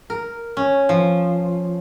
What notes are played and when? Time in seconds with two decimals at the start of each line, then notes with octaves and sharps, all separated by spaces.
0.10 A#4
0.57 C#4
0.89 F3